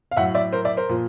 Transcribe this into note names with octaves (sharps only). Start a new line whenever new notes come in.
F5
A2 F#3 E5 F#5
D5 E5
A#4 C5
D5 E5
A#4 C5
A#2 F3